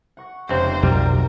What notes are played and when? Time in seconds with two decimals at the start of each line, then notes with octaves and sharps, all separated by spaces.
0.17 F#5 C#6 A#6
0.49 F1 C#2 C4 C5
0.83 B1 F2 F#3 G3 A#4